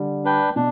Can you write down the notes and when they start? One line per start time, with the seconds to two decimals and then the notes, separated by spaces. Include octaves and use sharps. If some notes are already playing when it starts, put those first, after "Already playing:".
Already playing: D3 G3
0.25 D4 B4 G5
0.56 B2 D4